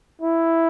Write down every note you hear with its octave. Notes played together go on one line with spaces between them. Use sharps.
E4